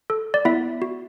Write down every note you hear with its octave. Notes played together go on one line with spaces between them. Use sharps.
A4
D5
B3 E4 E5
F#4